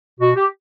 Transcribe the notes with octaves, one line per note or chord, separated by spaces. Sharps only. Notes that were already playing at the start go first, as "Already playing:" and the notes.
B2 F#4
G4